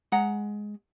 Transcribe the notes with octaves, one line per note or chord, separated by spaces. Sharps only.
G#3 F#5 A#5